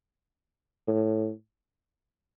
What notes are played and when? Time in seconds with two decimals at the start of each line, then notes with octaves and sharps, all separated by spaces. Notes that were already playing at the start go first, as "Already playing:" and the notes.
0.88 A2